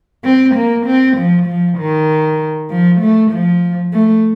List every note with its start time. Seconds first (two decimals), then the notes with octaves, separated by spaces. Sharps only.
0.24 C4
0.55 A#3
0.86 C4
1.17 F3
1.47 F3
1.78 D#3
2.70 F3
3.01 A3
3.32 F3
3.93 A3